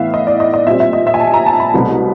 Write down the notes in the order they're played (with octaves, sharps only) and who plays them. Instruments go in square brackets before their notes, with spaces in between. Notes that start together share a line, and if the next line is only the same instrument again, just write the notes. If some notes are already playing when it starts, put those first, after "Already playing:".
Already playing: [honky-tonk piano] A2 E3 B3 E5 F5
D#5
D5
D#5
D#5
A#2 G3 C4 E5
E5
D#5
E5
G#5
A5
A#5
A5
B5
C2 B2 F#3 A3 C4